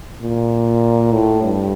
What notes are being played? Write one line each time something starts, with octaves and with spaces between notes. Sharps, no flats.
A#2
A2
G2